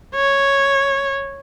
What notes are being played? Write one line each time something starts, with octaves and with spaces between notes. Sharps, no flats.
C#5